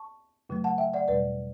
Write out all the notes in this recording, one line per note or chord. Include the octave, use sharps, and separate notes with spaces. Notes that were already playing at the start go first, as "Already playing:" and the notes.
Already playing: A5 C#6
F#2 C#3 F#3 A3
F#5 A5
E5 G5
D5 F#5
E2 B2 G3 B4 D5